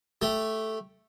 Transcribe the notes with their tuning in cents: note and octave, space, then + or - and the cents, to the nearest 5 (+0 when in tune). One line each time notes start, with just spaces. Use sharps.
A3 +0 G4 +0